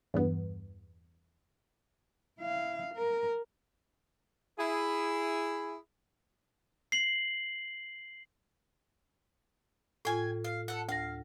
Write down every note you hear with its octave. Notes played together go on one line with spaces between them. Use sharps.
E2 G2 B3
E4 F5
A#4
E4 G#4
C7 F#7
A2 F4 G5 G#5
F5
A4 F#5
D2 F5 A#6